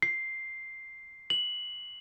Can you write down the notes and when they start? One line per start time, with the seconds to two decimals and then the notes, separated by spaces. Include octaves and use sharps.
0.02 C7
1.30 F#7